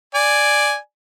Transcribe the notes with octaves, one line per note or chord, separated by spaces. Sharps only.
D5 G#5